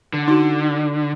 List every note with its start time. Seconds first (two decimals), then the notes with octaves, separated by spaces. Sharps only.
0.13 D3
0.28 D#4 F#4